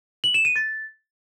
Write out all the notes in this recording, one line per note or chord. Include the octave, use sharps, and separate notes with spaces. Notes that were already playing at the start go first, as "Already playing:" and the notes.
F#7
E7
D#7
A6